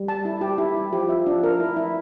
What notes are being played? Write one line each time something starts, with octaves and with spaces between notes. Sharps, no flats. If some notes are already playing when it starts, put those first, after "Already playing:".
Already playing: G3
A5
E4
G4
E4
E4
F3 G4
E5
D4
A#4
E4
E4